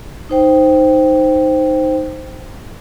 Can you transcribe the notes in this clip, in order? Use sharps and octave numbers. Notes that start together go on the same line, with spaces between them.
D#4 C5 G5